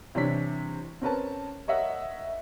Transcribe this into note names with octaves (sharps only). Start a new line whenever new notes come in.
C3 E3 G3 D4 C#5 B6
C4 C#4 A#4 B4 C#5 A5
A#4 C#5 D#5 E5 F#5